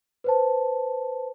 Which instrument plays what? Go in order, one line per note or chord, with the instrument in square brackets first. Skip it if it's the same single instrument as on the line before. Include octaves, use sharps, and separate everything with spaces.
[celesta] B4 C5 A5